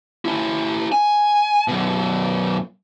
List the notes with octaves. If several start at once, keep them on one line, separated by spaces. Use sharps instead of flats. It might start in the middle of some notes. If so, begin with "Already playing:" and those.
C#4 E4
G#5
F#2 B2